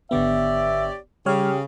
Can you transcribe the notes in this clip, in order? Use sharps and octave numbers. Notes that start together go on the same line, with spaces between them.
G#1 D3 B3 G4 C#5 D5 E5
C#3 G3 G4 C#5 F6